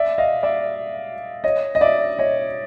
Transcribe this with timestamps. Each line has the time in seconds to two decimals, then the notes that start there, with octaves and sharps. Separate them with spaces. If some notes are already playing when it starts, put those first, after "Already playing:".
Already playing: D5 E5
0.18 D#5 F5
0.43 D5 E5
1.44 C#5 D#5
1.75 D#5
1.81 D5 E5
2.19 C#5 D#5